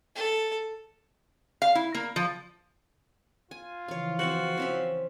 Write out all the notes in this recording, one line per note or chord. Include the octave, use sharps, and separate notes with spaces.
A4
F5
E4
A#3
F3
F4 G#5
C#3 E3 F3 C#5 F5
C4 F#4 C5
C4 C#4 E5